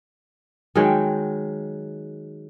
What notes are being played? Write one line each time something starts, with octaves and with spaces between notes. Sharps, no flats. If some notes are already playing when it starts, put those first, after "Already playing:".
D#3 F#3 G#3 G5